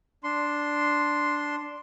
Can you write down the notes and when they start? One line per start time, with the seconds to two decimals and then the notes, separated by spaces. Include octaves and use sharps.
0.24 D4 C6